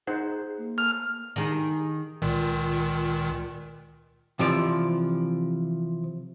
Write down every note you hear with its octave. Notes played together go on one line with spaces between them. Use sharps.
D#4 G#4 C5 F#5
A#3
F6
D#3 G#4
C#2 A#2 D#3
C3 E3 F3 D5